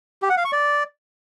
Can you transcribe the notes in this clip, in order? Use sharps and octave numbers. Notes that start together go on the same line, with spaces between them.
G4
F#5
F5
C#6
D5